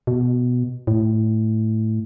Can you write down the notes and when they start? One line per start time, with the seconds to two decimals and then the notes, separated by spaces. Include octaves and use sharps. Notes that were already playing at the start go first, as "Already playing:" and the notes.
0.07 B2
0.87 A2